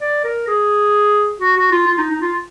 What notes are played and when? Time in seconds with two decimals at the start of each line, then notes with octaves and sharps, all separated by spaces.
0.01 D5
0.24 A#4
0.48 G#4
1.40 F#4
1.57 F#4
1.72 F4
1.87 F4
1.98 D#4
2.11 D#4
2.22 F4